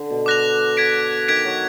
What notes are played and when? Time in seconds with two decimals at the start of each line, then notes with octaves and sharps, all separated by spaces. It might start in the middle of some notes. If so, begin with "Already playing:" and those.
Already playing: D3
0.10 B2
0.26 D6 F#6 A#6 F7
0.77 G#6 B6 D7
1.28 D#3 G#6 B6 D7
1.45 F#3